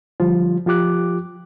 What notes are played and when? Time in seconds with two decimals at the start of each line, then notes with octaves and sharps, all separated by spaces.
0.20 D3 F3 G3 F4
0.66 F3 F4 G4 D6 F#6